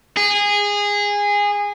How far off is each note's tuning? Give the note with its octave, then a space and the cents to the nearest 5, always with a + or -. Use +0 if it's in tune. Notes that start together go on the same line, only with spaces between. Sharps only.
G#4 -20